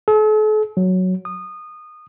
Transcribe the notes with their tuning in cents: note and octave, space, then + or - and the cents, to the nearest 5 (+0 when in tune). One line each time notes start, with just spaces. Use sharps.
A4 -45
F#3 +0
D#6 -20